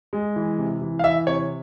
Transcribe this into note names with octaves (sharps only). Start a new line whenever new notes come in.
G#3
E3
C3
E3
F5
E3 E5
C3 C#5